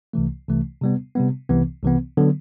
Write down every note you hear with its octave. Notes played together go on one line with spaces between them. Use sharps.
C2 C3 E3 A3
C2 C3 E3 A3
C3 G3 B3
C3 G3 B3
C2 C3 E3 B3
C2 C3 E3 B3
D3 F#3 B3